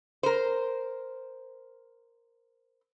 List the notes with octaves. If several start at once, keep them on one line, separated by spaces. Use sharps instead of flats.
A#4 C5